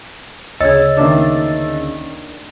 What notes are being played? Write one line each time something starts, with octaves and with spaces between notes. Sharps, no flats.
D2 C#3 G#4 C#5 D#5 E6 A6
D#3 A#3 D4 E5 D6